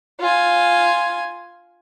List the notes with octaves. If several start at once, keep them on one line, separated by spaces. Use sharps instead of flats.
F4 G#5